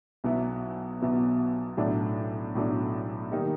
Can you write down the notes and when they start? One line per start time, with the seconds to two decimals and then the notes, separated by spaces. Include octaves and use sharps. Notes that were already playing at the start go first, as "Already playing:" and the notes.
0.24 B1 B2 F#3 B3 E4
1.01 B1 B2 F#3 B3 E4
1.77 B1 A2 F#3 A3 D4
2.55 B1 A2 F#3 A3 D4
3.32 D#3 G3 A#3 D#4